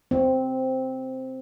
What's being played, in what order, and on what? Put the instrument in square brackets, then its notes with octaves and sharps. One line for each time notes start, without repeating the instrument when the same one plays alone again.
[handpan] C4